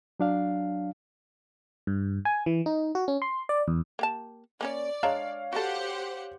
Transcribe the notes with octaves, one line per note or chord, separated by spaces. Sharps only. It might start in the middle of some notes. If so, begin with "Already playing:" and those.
F#3 D4 F5
G2
G#5
E3
D#4
F#4
C#4
C6
D5
E2
A#3 G4 A5
A#3 C#4 C#5 D5
G#3 D4 C#5 F5 A#5
F#4 G4 A4 C5 F#5